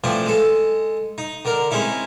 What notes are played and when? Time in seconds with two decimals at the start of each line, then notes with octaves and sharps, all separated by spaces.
0.04 E3 F3 A3 C4 D4
0.26 G#3 A4
1.18 D#4
1.45 D3 A#4
1.71 G#3 C4 C#4 D#4 E4